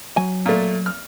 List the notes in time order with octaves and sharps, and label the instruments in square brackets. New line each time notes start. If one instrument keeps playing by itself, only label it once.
[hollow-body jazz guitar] F#3 G#5
[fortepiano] A#2 A3
F6